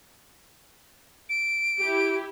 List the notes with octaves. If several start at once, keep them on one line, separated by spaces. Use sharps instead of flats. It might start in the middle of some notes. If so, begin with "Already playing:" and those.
D7
E4 G4